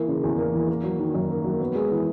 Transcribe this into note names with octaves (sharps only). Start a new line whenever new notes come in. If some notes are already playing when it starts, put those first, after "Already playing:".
Already playing: E3 A#3
C#3
E2
A#3
E3
A#3
F#3
D#3
F#2
A#3
F#3
B3
G#3
E3